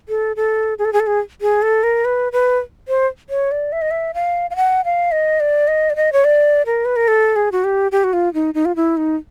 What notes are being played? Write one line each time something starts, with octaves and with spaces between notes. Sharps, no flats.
A4
A4
G#4
A4
G#4
A4
G#4
G#4
A4
A#4
B4
B4
C5
C#5
D5
E5
D#5
E5
F5
F5
F#5
F5
D#5
D5
D#5
D5
D#5
C#5
D5
A#4
B4
A#4
A4
G#4
F#4
G4
G4
F#4
F4
D#4
D#4
F4
E4
D#4